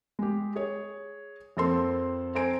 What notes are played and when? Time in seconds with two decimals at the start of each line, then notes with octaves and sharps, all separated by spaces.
0.19 G#3 G4
0.56 G#4 C#5
1.57 F2 A#3 C4 A4 C5 C6
2.35 C4 A4 C5 G#5 A#5 D7